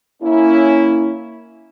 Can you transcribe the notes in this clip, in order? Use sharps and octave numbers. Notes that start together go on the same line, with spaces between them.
A#3 C#4 E4